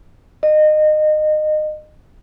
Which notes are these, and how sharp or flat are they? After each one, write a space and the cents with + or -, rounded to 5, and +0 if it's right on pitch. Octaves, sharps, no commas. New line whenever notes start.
D#5 -25